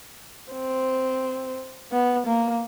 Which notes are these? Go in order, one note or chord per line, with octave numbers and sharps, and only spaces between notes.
C4
B3
A#3